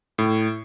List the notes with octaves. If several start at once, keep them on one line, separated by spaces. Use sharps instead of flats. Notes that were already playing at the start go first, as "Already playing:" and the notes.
A2